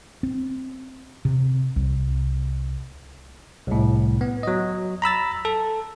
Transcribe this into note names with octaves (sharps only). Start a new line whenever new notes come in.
C4
C3
C2
C2 A2
B3
F#3 D#5
A#5 B5 E6 A6
A4